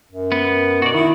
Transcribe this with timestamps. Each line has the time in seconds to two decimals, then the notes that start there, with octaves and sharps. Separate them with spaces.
0.12 F#2
0.32 B3
0.82 B2 F#4 D5
0.94 D#3 E4